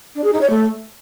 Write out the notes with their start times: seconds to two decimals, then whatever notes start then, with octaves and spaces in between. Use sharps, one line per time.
0.15 D4
0.24 G#4
0.33 D#4
0.41 C#5
0.50 A3